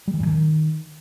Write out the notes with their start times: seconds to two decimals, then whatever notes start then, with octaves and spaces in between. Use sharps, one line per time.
0.08 G3
0.14 E3
0.20 G2
0.26 D#3